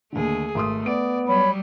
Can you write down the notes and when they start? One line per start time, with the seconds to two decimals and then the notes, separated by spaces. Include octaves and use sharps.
0.12 D#2 D3 A3 G#4
0.55 G#1 A3 C6 D#6
0.86 B3 D5 D7
1.28 F#3 G3 C#5 B5